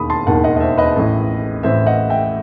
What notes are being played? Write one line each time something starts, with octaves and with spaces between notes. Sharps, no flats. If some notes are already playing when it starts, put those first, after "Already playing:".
Already playing: E1 D#2 D#3 B5 D#6
A5 C6
E1 D#2 D#3 F#5 A5
D#5 F#5
D#5
C5 E5
B4 D#5
A1 A2 E3
A1 A2 E3 C5 E5
D#5 F#5
E5 G5